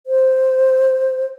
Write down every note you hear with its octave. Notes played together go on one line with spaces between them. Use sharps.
C5